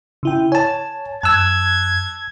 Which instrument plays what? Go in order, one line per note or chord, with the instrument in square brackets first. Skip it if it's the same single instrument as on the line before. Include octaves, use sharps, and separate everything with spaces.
[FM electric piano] C#3 E4 G5
[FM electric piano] C#5 [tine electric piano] G#5 A5
[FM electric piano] F#2 F#6 [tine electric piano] A5 E6 [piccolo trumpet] G#6